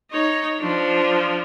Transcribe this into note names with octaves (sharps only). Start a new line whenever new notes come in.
D#4 C#5
F3 D4